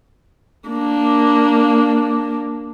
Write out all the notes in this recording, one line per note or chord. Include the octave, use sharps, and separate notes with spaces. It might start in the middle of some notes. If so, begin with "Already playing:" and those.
A#3 D4